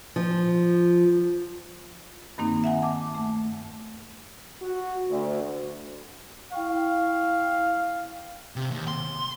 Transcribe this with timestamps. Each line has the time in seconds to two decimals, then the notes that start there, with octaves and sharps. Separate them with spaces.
0.16 F3
2.38 G2 D#3 A#3 C4 D#4
2.64 E5 F#5 G#5
2.82 A5 D6
3.15 A3
4.62 F#4
5.08 D2
6.52 E4 F5 G5 C#6
8.56 C3
8.71 D#2
8.88 C6